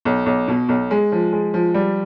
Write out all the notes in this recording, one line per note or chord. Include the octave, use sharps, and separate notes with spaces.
B1
B1
B2
B1
G#3
F3
G#3
F3
G3